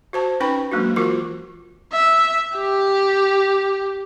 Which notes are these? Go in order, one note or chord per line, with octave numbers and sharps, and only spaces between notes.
F#4 C5 A5
C#4 D#4 B4 G5 B5 C#6
F#3 G#3 A#3 D4 F#4
E3 F4 F#4 A#4 D6
E5
G4